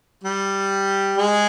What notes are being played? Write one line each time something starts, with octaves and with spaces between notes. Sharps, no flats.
G3 G4
G#3 G#4